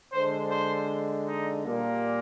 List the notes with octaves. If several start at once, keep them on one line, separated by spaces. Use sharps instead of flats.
D3 G#3 C5
C5
D#4
A#2 G3 A#3